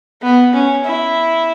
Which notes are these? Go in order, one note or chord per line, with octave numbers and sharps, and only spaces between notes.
B3
C#4
E4